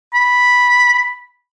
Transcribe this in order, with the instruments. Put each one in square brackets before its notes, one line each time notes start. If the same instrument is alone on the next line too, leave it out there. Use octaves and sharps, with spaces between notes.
[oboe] B5